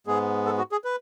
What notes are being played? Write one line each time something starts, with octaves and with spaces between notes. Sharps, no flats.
G#2 G#3 B3 G#4
A4
F#4
G#4
B4